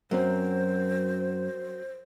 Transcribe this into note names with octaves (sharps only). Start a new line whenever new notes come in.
F#2 F#3 C4 A#4 C5